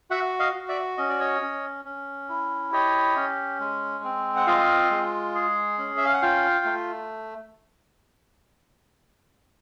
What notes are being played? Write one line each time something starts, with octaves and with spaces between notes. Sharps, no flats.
F#4 E5 F#5
D#5 F5
F#4
D5 E5
C#4 D#5
D5
C#5 D#5
C#4
C#4
E4
G4 C#5 D#5
C#4
G#3
C4
F#5
F4 D#5 F5
G#3
G#4
C#4
E5
F5
F#5
F4 F5 G5
A3